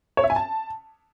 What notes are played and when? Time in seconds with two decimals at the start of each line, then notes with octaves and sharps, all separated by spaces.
0.17 C#5
0.24 E5
0.30 G#5
0.36 A5